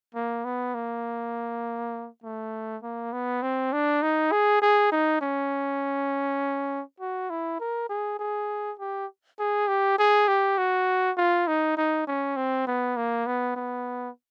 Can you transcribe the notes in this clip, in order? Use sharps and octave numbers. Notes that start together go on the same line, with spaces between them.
A#3
B3
A#3
A3
A#3
B3
C4
D4
D#4
G#4
G#4
D#4
C#4
F#4
E4
A#4
G#4
G#4
G4
G#4
G4
G#4
G4
F#4
F4
D#4
D#4
C#4
C4
B3
A#3
B3
B3